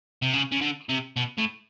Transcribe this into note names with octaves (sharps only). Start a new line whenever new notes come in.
C3
C#3
C#3
D3
C3
B2
A2